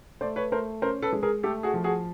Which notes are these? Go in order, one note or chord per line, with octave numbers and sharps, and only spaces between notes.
A3 C5 D5
B4 C#5
A3 A#4 C5
C#4 A#4 C5
A4 B4
G#3
G#4 A#4
A3 G4 A4
F#4 G#4
F3
F#4 G#4